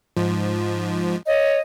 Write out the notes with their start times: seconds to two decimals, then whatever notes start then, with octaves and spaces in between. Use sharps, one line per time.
0.17 G#2 F3
1.26 C#5 D#5